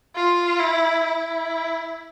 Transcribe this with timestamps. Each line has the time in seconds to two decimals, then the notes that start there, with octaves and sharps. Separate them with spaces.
0.15 F4
0.59 E4
1.03 E4